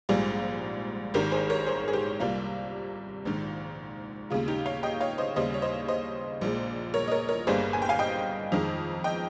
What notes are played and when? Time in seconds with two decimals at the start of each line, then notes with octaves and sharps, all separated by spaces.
0.09 A#1 G#2 G3 F4 G#4
1.14 G#1 G#2 D#3 G4 A#4
1.32 G#4 C5
1.50 A#4 C#5
1.66 G#4 C5
1.88 G#4
1.93 G4 A#4
2.20 C2 C3 G3 A#3 F4
3.25 A#1 G#2 D#3
4.30 D#2 C#3 G#3 F4
4.48 D#4 G4
4.66 C#5 F5
4.83 D#5 G5
5.00 C#5 F5
5.18 C5 D#5
5.36 D#2 C#3 G3 C5 D#5
5.54 C#5
5.62 C5 D#5
5.88 C5 D#5
6.41 A#1 A#2 G#3
6.94 A#4 C#5
7.08 D#5
7.11 A#4 C#5
7.29 A#4 C#5
7.47 G1 G2 G3 A#3 G#4 C5
7.73 G#5
7.82 G5
7.89 F5 G#5
7.99 D#5 G5
8.52 F2 D#3 G#3
9.04 D#5 G5